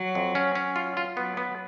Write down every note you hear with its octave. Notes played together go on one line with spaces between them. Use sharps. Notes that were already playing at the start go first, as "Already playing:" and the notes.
Already playing: F#3
F2
C#4
C#4
F4
F4
F#3 B3
B3